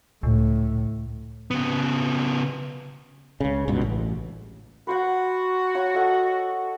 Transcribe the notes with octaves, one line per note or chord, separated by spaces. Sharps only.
C#2 A2
C#3 B3
C#2 C#3
C#2 G2 B2
A1
F#4 B4 C5 F#5
C#5 F#5 A#5
A4 D#5 F#5